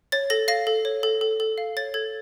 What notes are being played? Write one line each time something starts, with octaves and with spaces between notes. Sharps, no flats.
C#5 A6
A4 A#6
F5 A#6
A4
C#5
A4
A4
A4
F5
C#5 A6
A4 G#6